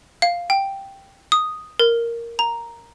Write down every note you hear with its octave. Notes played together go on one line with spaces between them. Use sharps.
F5
G5
D#6
A#4
A#5